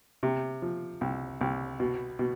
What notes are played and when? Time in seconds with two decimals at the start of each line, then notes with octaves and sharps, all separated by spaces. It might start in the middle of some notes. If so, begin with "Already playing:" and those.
0.23 C3
0.62 F3
1.01 C2
1.41 C2
1.80 B2
2.19 B2